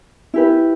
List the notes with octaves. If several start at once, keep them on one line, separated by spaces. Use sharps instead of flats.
E4 G4 B4